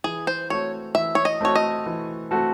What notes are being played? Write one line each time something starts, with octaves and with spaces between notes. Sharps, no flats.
E3 G#4
C5
A3 C4 F#4 A4 C#5
E3 E5
C#5
D#5
A3 C4 F#4 A4 C#5
D#5
E3
A3 C4 F#4 A4